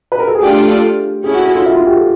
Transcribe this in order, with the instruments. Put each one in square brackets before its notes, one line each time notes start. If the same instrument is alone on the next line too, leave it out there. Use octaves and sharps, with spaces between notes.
[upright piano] B4
A#4
A4
G#4
[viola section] A3 D4 F4 A4 D5 [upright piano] G4
[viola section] C#4 E4 A4 [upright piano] G#4
[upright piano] F#4
F#4
F4
E4
F4
G4
A4